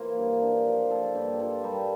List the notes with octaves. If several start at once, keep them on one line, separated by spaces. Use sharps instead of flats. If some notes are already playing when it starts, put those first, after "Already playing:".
Already playing: E3 A#3 F4 A#4 C5
G2
D4
F3
A#3 A4
G2 G4
F4 A4
G3 A#4